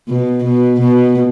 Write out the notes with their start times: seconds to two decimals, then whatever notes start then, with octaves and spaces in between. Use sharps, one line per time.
0.08 B2
0.44 B2
0.80 B2